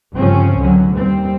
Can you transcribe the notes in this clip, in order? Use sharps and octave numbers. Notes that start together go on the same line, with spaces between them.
G1 C#3 F3 C4 C#4
C#2 D3 F#3
D#2 G3 C4